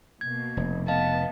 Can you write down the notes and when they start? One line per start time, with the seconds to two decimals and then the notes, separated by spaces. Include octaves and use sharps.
0.21 B2 A#3 G#6
0.57 F1
0.88 B3 D#5 F5 A5